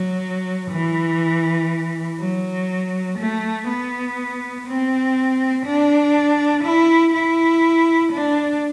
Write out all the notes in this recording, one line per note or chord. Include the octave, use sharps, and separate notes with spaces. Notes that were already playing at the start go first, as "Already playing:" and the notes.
Already playing: F#3
E3
F#3
A3
B3
C4
D4
E4
E4
D4